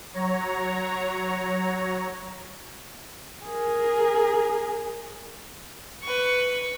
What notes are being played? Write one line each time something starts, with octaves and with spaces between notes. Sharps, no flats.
F#3 C#5 A#5
G#4 A#4
B4 C#6